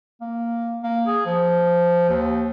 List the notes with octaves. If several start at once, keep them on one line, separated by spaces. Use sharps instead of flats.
A#3
A#3
G#4
F3
D#2